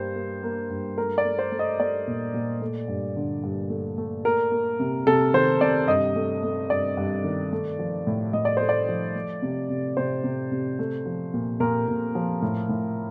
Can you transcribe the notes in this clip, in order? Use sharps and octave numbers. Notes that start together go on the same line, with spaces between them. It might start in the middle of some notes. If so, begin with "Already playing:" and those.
Already playing: G2 G3 A#3 C5
A#3
A#3
G2
A3 A#4
D5
A3
C5
A3
D#5
A3 D5
A#2
A#2
A3
G2
D3
G2
A3
A3
A#3 A#4
A#3
C3
C3 A4
D#3 C5
C3 D5
G2 D#5
A3
A3
G2 D5
G2
D#3
A3
F3
A2
A2 D#5
D5
A3 C5
D5
F3
A3
C3
C3
C3 C5
C3
C3
A3
F3
A#2
A#2 A#4
A#2
F3
A2
A2